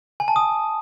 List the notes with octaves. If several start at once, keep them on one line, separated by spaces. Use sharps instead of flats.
G#5
A5
D#6